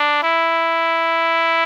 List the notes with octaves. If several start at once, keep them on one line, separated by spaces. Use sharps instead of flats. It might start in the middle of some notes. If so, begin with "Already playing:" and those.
Already playing: D4
E4